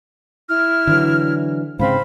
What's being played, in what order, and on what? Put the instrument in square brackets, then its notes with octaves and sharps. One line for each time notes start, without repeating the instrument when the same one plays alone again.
[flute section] E4 F6
[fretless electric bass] D3 E3 F#3
[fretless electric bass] G#2 C#3 C4 [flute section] C5 F5 B5